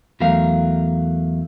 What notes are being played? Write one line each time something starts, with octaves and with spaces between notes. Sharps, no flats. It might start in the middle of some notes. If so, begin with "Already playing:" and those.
E2 F#3 A3 A#4 F5